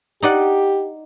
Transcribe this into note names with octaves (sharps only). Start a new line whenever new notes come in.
D#4 G4 D5 F#5